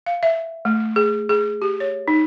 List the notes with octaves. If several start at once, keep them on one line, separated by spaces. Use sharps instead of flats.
F5
E5
A3
G#4
G#4
G4
C#5
D#4